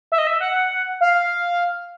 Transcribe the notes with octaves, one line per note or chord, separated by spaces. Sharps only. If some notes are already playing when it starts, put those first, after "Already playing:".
E5
D#5
E5
F#5
F5